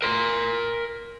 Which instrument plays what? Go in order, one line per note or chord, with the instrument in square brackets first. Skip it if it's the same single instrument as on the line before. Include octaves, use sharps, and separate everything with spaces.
[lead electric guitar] A#4 C6